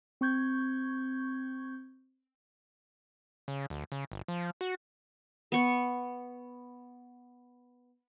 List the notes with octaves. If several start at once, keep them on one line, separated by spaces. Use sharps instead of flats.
C4 C#6 G6 G#6
C#3
D2
C#3
G1
F3
F#4
B3 C#6